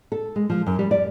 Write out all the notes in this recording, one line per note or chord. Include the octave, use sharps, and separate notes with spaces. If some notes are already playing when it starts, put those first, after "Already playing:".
A4
G#3
F3
F#2
G3
D5